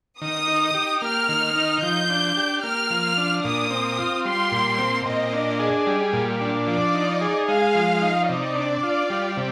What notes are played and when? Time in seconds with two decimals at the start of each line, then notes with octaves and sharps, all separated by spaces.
0.21 D#3 D#6
0.48 D#4
0.74 G4
1.02 A#3 F6
1.29 D#3
1.56 D#4
1.82 F3 G6
2.10 D4
2.37 G4
2.63 A#3 F6
2.90 F3
3.17 D4
3.44 A#2 D#6
3.71 C4
3.98 F4
4.25 G3 C6
4.52 A#2
4.78 C4
5.05 A#2 D#5
5.33 D4
5.59 G#4
5.86 G3
6.13 A#2
6.41 D4
6.67 F3 D5
6.94 D#4
7.21 G#4
7.48 G#3 F5
7.75 F3
8.02 D#4
8.29 C3 D5
8.56 D4
8.83 F4
9.10 G3
9.37 C3